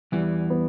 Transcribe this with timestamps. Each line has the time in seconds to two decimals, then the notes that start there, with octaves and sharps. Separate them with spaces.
0.12 E2 E3 G3
0.50 B3